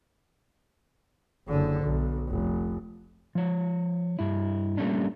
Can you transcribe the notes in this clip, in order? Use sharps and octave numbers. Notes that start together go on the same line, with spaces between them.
F#1 D3
B1
F1
F3 C#5
G2 E4
G3 A3 A#3 C#4 D4